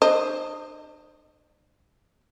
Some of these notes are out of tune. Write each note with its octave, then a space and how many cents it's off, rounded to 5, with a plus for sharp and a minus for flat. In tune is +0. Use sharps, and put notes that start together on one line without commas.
D4 +45 C5 +0 D#5 +0